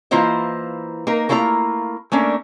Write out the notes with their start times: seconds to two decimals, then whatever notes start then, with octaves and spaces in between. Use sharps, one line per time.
0.11 E3 A#3 E4 F4 C5 D#5
1.07 A#3 D#4 A#4
1.29 A3 A#3 E4 F4 C5 A#5
2.12 A3 A#3 C#4 D4